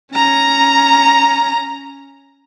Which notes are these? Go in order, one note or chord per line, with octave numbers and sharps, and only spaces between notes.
C#4 A#5